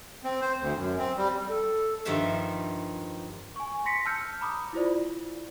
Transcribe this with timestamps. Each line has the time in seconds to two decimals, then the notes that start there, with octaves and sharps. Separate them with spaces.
0.24 C4
0.42 C5
0.60 D2
0.76 F#2
0.99 C4
1.17 G3
1.48 A4
2.05 G2 D#3 F3 E5 F5
3.56 G#5 C#6
3.85 C6 A#6 B6 C#7
4.05 A5 E6 F6 G6 C#7
4.41 A#5 B5 D6 D#6
4.73 E4 F4 C5 D5